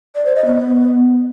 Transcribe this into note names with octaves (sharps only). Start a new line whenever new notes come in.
D5
C5
D#5
B3